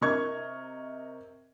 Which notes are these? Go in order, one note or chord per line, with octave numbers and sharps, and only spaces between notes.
C3 A#4 D#5 C#6 G#6